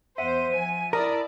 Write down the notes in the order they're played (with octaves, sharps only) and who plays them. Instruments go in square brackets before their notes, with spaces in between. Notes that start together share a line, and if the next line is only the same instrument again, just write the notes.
[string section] E2 C5 [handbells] E5 F#5 [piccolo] D#7
[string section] F3 G#5
[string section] E4 D5 A5 [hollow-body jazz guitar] A#4 [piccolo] D#6